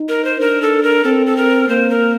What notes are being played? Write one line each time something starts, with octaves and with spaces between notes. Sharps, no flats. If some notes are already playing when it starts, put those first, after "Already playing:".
Already playing: D#4
A#4
C5
D4 A#4
A4
A#4
C4 A4
A4
A#4
A#3 C5
A#4